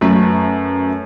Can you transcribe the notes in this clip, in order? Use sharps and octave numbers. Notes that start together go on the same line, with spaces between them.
F#2 A3 C#4 B4